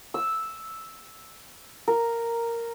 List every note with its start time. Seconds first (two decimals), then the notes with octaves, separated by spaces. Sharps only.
0.14 E6
1.88 A#4